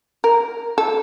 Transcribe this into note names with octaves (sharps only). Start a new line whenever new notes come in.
A#4
A4